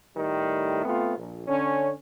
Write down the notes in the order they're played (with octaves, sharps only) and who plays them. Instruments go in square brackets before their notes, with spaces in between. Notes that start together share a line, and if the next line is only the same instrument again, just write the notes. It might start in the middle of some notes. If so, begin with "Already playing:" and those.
[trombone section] A2 D#3 G3 A3
A3 B3 C4 F4
A#1
D3 C#4